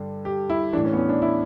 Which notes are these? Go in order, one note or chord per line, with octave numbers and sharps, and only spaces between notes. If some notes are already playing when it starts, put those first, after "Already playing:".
Already playing: G2 D3
G4
E4
A2 E3 D4
C#4
B3
C#4
D4
E4